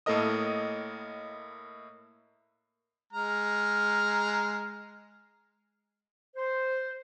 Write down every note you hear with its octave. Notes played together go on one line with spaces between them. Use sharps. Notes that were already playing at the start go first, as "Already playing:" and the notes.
A2 A#3 A4 A#4 D#5 D#6
G#3 A#5 F6
C5